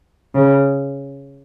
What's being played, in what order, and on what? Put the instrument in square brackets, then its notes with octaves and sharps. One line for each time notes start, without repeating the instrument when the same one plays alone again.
[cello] C#3